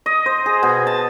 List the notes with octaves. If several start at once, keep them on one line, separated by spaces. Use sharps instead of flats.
D#5
C5
G#4
B2
A5